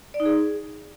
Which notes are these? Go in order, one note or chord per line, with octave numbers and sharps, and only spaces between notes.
D5
D#4
G#4